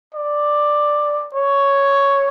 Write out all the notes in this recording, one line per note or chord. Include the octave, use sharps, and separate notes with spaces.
D5
C#5